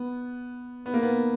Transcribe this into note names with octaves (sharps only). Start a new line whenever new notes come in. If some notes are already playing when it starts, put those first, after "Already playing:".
Already playing: B3
B3
A#3
B3